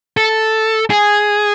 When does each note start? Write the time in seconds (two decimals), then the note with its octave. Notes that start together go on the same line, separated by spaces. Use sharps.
0.17 A4
0.90 G#4